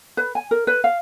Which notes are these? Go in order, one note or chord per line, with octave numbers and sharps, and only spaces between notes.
B4
G#5
A#4
B4
F5